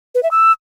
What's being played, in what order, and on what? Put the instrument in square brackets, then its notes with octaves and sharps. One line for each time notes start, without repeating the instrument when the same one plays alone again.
[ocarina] B4
E5
E6